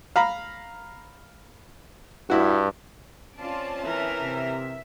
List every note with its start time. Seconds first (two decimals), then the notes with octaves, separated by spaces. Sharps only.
0.16 F5 A#5 B5
2.30 G2 E4 F#4
3.38 C4 C#4 F4 D5 A5
3.84 E3 A#4 E5
4.21 C3